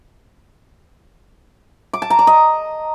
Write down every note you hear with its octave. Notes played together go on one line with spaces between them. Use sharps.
D6
A5
A#5
D5
D#5